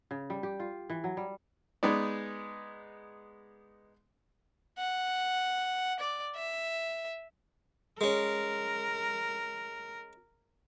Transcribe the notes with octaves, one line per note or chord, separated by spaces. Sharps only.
C#3
G3
G4
F4
E3
F#3
G3
G#3 B3 D#4 D5
F#5
D5
E5
G#3 C#4 A#4